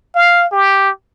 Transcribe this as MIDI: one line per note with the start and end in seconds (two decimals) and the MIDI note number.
0.15 0.47 77
0.52 0.90 67